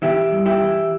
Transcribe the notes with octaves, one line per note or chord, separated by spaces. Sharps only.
E3 E4 G4
G2
E4 G4
E3